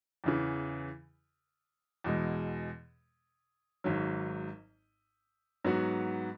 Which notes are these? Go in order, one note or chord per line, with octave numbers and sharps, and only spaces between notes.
E2 C#3 E3
E2 B2 G#3
G#1 G#2 F#3
G#2 F#3 B3 F#4